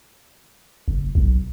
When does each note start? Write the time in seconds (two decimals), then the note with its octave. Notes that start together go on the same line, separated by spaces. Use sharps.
0.88 F#1
1.15 B1